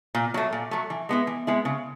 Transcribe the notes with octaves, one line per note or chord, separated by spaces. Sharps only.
A#2
F#3 A3
A#2
F#3 A3
E3
G#3 B3 E4
E3
G#3 B3 E4
C#3